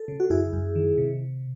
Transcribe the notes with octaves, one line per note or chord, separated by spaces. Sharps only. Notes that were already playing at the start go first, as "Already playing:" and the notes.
Already playing: A4
C#3
F#4
F#2 E4 G#4
F#2
D#3
C3